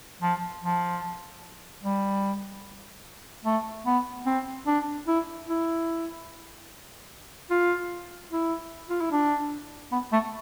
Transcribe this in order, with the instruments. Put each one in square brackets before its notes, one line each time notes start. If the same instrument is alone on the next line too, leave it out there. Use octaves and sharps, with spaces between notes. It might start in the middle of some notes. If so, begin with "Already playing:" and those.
[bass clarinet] F3
F3
G3
A3
B3
C4
D4
E4
E4
F4
E4
F4
E4
D4
B3
A3